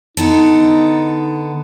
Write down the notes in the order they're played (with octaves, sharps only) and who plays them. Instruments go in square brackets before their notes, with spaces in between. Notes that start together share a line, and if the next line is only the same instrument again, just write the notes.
[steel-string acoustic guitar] D3 B3 A4 [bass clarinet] D#4